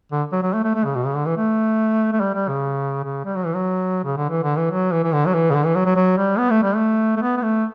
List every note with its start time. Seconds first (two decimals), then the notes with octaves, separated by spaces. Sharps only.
0.12 D3
0.32 F#3
0.43 F#3
0.54 A3
0.64 A3
0.75 A3
0.85 C#3
0.95 B2
1.06 C#3
1.16 D3
1.26 E3
1.37 A3
2.13 A3
2.20 G3
2.34 G3
2.48 C#3
3.04 C#3
3.25 G3
3.35 F#3
3.46 E3
3.55 F#3
4.04 C#3
4.17 D3
4.30 E3
4.43 D3
4.57 E3
4.71 F#3
4.92 E3
5.04 E3
5.13 D3
5.27 F#3
5.34 E3
5.50 C#3
5.55 D3
5.65 E3
5.75 F#3
5.86 F#3
5.96 F#3
6.17 G3
6.38 B3
6.50 A3
6.63 G3
6.76 A3
7.17 A3
7.22 B3
7.37 B3
7.42 A3